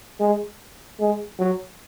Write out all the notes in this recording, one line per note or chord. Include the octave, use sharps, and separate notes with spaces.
G#3
G#3
F#3